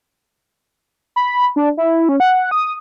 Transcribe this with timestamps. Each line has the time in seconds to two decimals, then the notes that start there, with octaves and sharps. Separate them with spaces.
1.16 B5
1.56 D4
1.77 E4
2.09 C#4
2.20 F#5
2.51 D#6